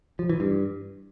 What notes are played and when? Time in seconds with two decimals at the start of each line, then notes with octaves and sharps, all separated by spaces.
0.19 F3
0.30 E3
0.40 G2